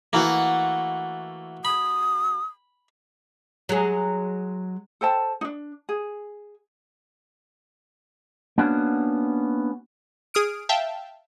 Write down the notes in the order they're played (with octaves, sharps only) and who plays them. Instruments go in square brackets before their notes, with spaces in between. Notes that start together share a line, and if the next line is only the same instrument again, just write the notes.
[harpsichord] E3 A#3 [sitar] A3 F#4
[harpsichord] B5 [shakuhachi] D#6
[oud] F#3 G#3 G#4
[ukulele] A4 C5 G5 A5
D4 D#4
G#4
[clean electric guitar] A#3 B3 C#4 D4 F#4
[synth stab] G#4 D#6 F6 D7
E5 F5 G5 A5